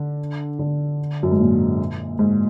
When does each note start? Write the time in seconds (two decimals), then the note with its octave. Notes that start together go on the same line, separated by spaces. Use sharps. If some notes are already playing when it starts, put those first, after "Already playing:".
Already playing: D3
0.59 D3
1.23 F#2
1.32 G#2
1.40 A#2
2.19 G#2